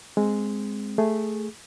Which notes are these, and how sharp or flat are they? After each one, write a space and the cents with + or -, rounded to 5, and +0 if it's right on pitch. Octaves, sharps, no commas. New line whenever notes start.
G#3 +0 C4 +0
A3 -5 G#4 +0